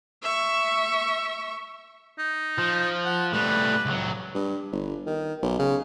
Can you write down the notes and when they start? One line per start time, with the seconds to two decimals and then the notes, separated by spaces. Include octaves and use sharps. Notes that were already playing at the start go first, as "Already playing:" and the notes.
0.22 E5 C#6
2.18 D#4
2.58 F3
3.05 F#5
3.33 A2 G3 B4
3.86 C#2 F#3
4.34 G2
4.72 G1
5.06 D#3
5.43 B1
5.59 C#3